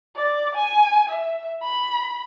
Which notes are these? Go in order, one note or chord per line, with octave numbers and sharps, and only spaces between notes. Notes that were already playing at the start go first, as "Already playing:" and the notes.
D5
G#5
E5
B5